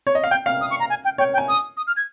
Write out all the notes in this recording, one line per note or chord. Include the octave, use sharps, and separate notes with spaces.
C#5
D#5
F5
G5 G6
F5 F6
D#6
C#6
A#5
G#5
G5
C#5 G5
G5
G#5
D#6
D#6
F6
G#6